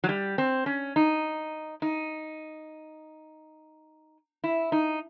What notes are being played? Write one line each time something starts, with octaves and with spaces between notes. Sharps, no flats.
F#3
G3
C4
C#4
D#4
D#4
E4
D#4